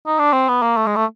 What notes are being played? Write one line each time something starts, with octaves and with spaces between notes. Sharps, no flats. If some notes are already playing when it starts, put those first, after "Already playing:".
D#4
D4
C4
B3
A#3
A3
G#3
A3